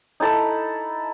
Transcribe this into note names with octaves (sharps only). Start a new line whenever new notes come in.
D#4 E4 A4 B5